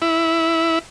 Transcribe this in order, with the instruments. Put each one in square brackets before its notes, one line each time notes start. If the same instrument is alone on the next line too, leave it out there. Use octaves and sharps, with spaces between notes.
[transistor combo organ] E4